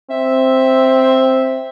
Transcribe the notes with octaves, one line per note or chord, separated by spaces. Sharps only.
C4 E5